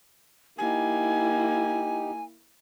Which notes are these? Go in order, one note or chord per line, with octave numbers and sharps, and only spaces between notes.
A#3 D#4 E4 G4 G#5